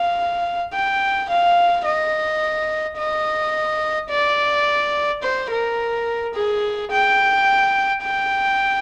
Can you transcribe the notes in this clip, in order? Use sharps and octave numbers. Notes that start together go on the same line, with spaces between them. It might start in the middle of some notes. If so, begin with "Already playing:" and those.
Already playing: F5
G5
F5
D#5
D#5
D5
C5
A#4
G#4
G5
G5